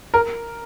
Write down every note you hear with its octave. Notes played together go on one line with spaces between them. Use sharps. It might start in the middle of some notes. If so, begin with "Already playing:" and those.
A#4